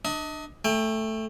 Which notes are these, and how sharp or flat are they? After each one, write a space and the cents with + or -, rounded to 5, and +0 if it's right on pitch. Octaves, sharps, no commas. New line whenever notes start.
D4 +30 D#5 +30
A3 +0 G5 +30